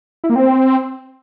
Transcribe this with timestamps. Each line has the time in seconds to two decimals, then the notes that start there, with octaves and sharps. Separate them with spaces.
0.24 E4
0.30 A#3
0.36 C4